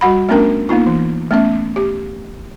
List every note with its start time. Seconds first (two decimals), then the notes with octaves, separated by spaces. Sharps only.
0.01 G3 F#4 F#5 B5
0.29 A3 B3 C#4 D4 A#4 G5
0.69 A#3 B3 D#4 F4
0.86 E3
1.31 A3 B3 C#4 E5
1.76 G4